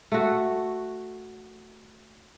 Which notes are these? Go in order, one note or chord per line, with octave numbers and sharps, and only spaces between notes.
A3 F#4